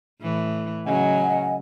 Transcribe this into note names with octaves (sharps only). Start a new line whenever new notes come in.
A2 E3
C#3 F#3 D#5 F#5 G#5